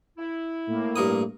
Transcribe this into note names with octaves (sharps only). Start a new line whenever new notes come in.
E4
A2 A#3
G2 A#4 D#6